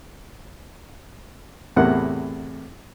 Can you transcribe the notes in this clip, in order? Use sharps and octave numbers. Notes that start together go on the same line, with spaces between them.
E2 A2 C3 A#4 F#5